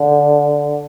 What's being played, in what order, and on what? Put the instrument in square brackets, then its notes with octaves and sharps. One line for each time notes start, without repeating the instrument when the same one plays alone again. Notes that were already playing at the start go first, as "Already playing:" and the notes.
Already playing: [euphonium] D3